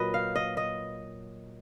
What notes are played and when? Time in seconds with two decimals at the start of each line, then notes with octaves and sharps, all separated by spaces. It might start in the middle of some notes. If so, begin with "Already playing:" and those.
Already playing: A#2 F#3 B4 D#5
0.14 F5
0.36 D#5
0.57 D#5